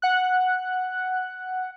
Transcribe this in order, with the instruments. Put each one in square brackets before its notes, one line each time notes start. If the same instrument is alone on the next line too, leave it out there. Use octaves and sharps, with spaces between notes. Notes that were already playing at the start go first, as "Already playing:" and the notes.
[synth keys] F#5 F#6